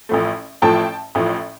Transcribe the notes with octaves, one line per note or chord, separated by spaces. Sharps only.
A1 A2 F3 A3
A1 A2 F3 A3 G5 A5
A1 A2 F3 A3